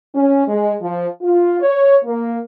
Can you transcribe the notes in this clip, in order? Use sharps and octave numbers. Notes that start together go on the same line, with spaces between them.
C#4
G#3
F3
F4
C#5
A#3